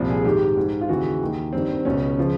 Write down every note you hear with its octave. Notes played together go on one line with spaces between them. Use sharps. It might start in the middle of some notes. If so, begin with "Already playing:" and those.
Already playing: C2 A#2 F3
G#4
G#2 D#3 G4
G#2 D#3
F4
D#2 C#3 E3 F#4
D#2 D#3
G2 D#3 C4
C4
C#2 B2 C#4
C#3 F3